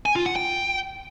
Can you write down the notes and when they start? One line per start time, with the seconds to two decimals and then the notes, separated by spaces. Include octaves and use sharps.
0.06 G#5
0.16 F4
0.26 F#5
0.36 G5